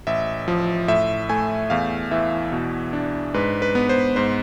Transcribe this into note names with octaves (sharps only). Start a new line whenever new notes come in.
A1 E5
F3
A2 E5
A3 G#5
E2 F5
E3 E5
B2
D4
G#2 B4
B4
B3
C5
G#2 C5